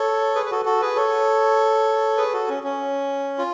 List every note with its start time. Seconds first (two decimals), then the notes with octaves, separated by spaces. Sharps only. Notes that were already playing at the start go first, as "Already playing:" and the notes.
Already playing: A4 C#5
0.35 G#4 B4
0.46 B4
0.51 F#4 A4
0.65 F#4 A4
0.81 G#4 B4
0.96 A4 C#5
2.17 G#4 B4
2.33 F#4 A4
2.49 C#4
2.63 C#4
3.38 F4